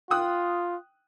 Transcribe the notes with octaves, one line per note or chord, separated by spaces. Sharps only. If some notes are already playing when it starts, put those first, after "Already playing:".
F4 G5 D#6 F#6